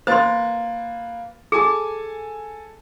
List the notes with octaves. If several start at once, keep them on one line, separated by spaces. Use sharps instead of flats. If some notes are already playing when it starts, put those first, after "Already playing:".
A#3 B4 C5 C6 A6
G#4 A4 G#5 A5